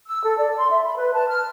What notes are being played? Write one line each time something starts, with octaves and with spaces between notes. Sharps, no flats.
E6
A4
D5
C6
E5
B5
B4
A5
F6